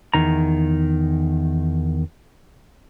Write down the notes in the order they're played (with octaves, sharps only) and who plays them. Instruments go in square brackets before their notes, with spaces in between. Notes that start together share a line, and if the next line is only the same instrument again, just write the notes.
[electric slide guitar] E2 D#3 A#5